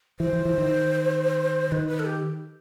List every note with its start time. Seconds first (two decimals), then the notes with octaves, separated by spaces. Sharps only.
0.20 E3 C5
0.33 E3
0.45 E3
0.58 D#3
1.72 D#3 B4
1.88 B4
1.99 A4
2.05 G4